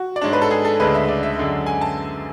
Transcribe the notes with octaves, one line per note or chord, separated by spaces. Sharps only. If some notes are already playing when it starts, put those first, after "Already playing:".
Already playing: F#4
D5
G#2 G#3 D4 C#5
B4
A4
G#4
A4
D2 C#3 G#3 D4 B4
E5
D5
E5
F#2 D3 G#3
G#5
A5